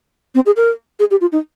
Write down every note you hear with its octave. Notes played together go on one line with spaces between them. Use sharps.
C4
G#4
A#4
G#4
G4
F4
D#4